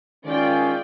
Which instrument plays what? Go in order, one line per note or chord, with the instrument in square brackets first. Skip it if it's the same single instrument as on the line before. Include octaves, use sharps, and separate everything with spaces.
[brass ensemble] D#3 G#3 F4 [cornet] C#4 [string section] D5 G5